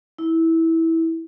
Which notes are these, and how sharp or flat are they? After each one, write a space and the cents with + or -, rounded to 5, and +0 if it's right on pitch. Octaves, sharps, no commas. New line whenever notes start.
E4 -15